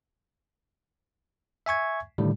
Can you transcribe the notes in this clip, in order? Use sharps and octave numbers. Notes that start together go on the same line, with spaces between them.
E5 G#5 C#6 G#6
A2 D3 D#3 G3